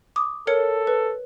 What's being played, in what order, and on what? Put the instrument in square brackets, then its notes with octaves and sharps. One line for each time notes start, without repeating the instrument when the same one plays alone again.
[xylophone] D6 D#6
[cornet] A4 [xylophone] A#4 C#5 C#7
[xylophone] B4